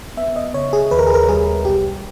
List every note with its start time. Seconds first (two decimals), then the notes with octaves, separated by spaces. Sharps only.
0.17 B3 E5
0.36 D#5
0.54 C#3 C#5
0.73 G#4
0.91 D#2 B4
0.99 A#4
1.07 G#4
1.14 A#4
1.28 G3 G#4
1.65 B1 G4